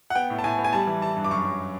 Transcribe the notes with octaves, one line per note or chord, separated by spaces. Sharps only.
F#5
B3 G5
A2
A5
A2 G#5
B3
G#5
G3 A5
E3
E3 A5
G2
D6
F#2 C#6
F#3